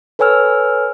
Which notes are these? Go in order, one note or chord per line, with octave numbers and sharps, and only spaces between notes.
A4 B4 C#5 G#5 E6 F6